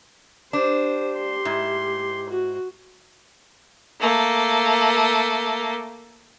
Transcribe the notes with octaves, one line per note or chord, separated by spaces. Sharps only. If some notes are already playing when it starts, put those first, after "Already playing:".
D4 G4 C5
C6
G#2 E4
F#4
A3 A#3